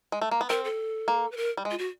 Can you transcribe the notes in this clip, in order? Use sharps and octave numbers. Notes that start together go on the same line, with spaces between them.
G#3
A3
A#3
B3
C4 A#4
A4
A#3
B4
A#4
G3
G#3
F4
F#4